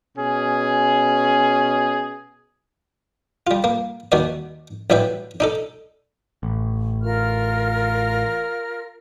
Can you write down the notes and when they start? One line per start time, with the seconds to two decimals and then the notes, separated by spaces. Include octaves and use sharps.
0.17 B2 C#4 G#4
3.47 G3 F4
3.64 A#3
4.12 D#2 D#3 F#4 D5
4.90 A1 F#3 D4 E4 B4 G5
5.40 D4 D#4 A4
6.43 A1
7.03 F4 A#4 F6